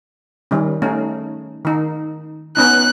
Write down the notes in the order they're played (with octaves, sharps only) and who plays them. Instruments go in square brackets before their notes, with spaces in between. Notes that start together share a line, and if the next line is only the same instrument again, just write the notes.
[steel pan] D#3 G3 C#4
A3 C#4 D#4
D#3 D#4
[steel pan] B3 C#4 D#4 [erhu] F#6